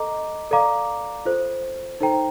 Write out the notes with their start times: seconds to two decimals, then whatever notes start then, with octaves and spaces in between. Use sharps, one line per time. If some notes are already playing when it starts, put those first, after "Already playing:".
Already playing: A4 D#5 A#5 D6
0.51 A4 D5 F5 A#5 D6
1.25 F4 A4 C5
2.00 D#4 A4 C5 G5 A#5